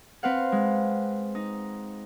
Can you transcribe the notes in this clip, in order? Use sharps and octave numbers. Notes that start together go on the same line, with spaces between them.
C4 B4 F5 F#5
G#3
D#4